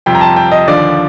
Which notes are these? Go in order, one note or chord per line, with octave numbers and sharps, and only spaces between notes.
F2 C3 G3 G5
A#5
A5
G5
D#5
D#2 D3 F3 D5